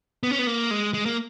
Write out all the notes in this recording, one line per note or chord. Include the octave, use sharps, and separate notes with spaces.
B3
C#4
B3
A#3
G#3
G#3
A#3